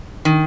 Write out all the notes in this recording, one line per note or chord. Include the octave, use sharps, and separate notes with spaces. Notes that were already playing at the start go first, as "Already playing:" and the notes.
D#3